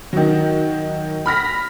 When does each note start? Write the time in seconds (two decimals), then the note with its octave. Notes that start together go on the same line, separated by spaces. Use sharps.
0.13 D#3 F#3
1.26 B5 F6 A#6 B6